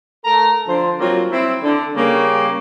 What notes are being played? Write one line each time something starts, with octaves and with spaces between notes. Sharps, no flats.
A3 A4 A#4 A#5
D3 F3 C5
F#3 G3 A#3 C4 F4
C4 E4
D3
C#3 G3 A#3